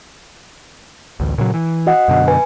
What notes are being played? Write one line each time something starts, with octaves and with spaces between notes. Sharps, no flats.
A1 D2
A#2 C#3 F#3
E3
F#4 D#5 F#5
F#2 B2 D3
B4 G#5